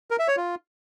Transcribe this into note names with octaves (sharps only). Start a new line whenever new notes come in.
A#4
E5
C#5
F4